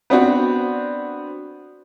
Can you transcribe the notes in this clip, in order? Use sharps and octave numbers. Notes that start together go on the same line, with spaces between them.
B3 C4 D4 F#4